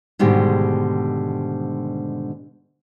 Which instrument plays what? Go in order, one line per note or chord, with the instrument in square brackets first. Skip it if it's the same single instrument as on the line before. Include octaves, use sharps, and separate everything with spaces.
[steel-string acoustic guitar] G#2 B2 D3 D#3 G3 G#3